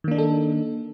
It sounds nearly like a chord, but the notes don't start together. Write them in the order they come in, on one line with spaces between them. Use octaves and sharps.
D#3 A#3 D4 D#4 A4